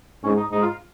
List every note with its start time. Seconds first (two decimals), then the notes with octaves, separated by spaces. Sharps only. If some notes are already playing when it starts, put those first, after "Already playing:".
0.23 G#2 C#4
0.37 D#4
0.51 G#2 D#4
0.62 F4